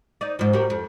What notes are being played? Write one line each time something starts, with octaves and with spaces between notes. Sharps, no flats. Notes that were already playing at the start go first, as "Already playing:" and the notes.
D#4 D5
G#2 F3
G3 F#4 A#4
F2